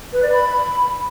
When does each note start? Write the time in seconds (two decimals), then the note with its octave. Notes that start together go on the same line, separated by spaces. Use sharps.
0.13 B4
0.23 D5
0.32 B5